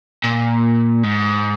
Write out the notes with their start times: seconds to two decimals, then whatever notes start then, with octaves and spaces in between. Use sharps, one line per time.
0.24 A#2
1.04 G#2